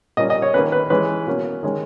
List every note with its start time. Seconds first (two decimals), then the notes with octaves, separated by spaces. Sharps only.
0.17 A#2 G3 A#3 C#4 D#5
0.30 D#5
0.42 C#5
0.54 D#3 A#3 C#4 B4
0.72 B4
0.90 E3 G#3 C#4 B4
1.27 B2 A#3 C#4
1.63 D#3 G#3 C#4